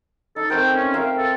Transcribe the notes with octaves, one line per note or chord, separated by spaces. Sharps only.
D#4 A4
A3 C4 A#4 G5
C#4
A#4 E5 F5 G5
A4